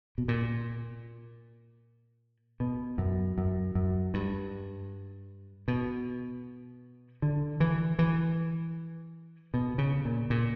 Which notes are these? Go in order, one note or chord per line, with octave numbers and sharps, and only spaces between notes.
B2
A#2
B2
F#2
F#2
F#2
G2
B2
D3
E3
E3
B2
C#3
A#2
A#2